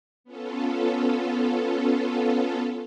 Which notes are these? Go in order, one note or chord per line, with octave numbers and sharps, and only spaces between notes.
B3 C#4 F4 A4